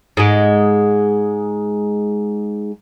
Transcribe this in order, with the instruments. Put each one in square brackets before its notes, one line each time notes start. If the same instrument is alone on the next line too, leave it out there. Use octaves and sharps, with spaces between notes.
[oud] G#2 G#3